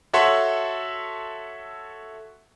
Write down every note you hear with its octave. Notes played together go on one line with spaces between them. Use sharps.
F#4 A4 C#5 E5 F#5 C6